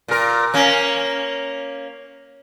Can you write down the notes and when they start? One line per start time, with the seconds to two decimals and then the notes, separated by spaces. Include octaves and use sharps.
0.08 A#2 A#4
0.54 A#3 C#4